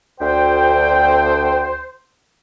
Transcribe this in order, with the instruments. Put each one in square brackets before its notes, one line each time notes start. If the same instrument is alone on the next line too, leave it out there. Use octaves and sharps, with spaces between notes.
[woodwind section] D2 G5 [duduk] C5